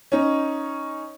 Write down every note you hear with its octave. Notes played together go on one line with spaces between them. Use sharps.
C#4 D#4